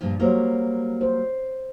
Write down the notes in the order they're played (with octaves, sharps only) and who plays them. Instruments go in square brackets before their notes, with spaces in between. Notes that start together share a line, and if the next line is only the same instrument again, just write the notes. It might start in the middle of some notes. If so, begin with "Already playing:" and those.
[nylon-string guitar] G2 A#2 F3
[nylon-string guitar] F#3 G3 A#3 [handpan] F4 C5 C#5
[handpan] C5